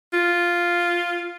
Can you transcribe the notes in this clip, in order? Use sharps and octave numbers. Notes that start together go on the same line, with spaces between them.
F4